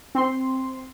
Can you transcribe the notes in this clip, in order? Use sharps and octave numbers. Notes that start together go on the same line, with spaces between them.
C4 C6